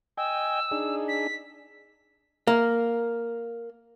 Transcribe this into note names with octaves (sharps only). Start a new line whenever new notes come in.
D#5 G5 G#5 E6
D4 D#4 G#4
B6
A#3